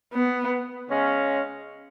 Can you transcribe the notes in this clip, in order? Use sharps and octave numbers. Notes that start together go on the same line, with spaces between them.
B3
C#3 G#3 C#4